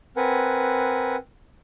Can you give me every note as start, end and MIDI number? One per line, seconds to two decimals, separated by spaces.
0.17 1.16 60
0.17 1.16 70
0.17 1.16 71
0.17 1.16 78
0.17 1.16 80